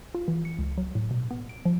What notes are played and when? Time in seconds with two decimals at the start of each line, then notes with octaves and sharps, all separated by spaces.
0.15 F4
0.28 E3
0.45 C#7
0.59 C#2
0.78 F#3
0.95 A2
1.11 B2
1.31 B3
1.49 D7
1.65 F3